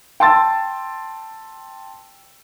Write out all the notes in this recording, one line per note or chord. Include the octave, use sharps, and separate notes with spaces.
G5 A5 C6 E6 A6